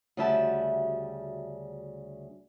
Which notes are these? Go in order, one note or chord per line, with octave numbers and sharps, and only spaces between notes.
D2 C#3 G3 F#4 E5 A5